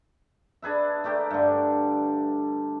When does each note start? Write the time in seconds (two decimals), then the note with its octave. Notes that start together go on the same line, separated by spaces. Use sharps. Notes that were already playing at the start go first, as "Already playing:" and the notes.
0.62 D4 G#4 B4 E5
1.04 A3 D4 G4 A#4
1.30 G2 D3